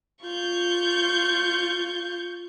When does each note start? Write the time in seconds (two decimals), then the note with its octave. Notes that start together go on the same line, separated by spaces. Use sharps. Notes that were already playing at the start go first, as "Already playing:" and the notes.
0.24 F4 C#6 G6